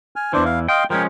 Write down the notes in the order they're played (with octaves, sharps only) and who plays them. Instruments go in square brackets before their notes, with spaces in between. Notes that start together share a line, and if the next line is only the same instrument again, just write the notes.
[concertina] G#5 F6
[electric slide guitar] E2 E3 [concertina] D4 C5
[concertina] F5
[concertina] D#5 F5 C6 [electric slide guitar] G5
[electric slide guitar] F3 G#3 C#4 [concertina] A#4 G5